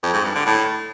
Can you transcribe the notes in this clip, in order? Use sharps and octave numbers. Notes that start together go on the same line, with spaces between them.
F2
G#2
G2
D3
A2